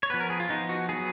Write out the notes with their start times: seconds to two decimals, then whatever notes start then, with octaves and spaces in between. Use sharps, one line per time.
0.03 C#5
0.10 F3 B3 B4
0.20 A#4
0.30 G#4
0.40 F4
0.49 F3 B3 D#4
0.69 F#4
0.89 F#3 B3 G#4